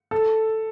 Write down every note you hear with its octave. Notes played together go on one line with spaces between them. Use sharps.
A4